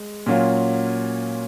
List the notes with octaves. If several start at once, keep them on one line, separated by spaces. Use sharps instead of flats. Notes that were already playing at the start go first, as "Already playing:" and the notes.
Already playing: G#3
A#2 F#3 C#4 F4